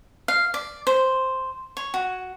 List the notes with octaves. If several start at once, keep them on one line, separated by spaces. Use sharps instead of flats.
F5
D5
C5
C#5
F#4